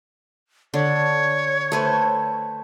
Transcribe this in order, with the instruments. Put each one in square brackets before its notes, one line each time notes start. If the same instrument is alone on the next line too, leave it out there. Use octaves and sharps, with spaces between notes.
[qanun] D3 [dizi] C#5
[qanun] A3 B4 C5